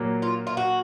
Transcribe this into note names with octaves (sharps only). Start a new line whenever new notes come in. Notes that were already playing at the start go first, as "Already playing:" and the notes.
Already playing: A#2 F#3 A#3
F4
F4
F#4